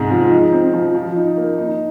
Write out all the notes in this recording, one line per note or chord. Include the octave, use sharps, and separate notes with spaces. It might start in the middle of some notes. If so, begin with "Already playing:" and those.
Already playing: G#2 C3 G#3
F3
D#4
C4
F3
F3
D#4
A#3
D#4